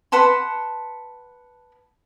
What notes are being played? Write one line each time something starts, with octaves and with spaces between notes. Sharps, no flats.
B4 F#5 A5 C6